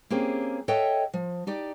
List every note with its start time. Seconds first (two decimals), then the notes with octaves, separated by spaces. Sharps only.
0.10 A#3 C4 C#4 G4 G#4
0.68 A4 C#5 D#5 E5 F#5 G5
1.13 F3
1.47 D#4 G4 D5